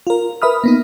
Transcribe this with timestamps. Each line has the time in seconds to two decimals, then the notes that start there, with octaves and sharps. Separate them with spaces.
0.07 F4 A#4
0.42 A#4 B4 E5 B5 D#6 F6
0.64 A#3 B3 D#4